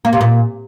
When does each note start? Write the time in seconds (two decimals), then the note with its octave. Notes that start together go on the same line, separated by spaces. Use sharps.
0.05 A#3
0.13 C3
0.21 A#2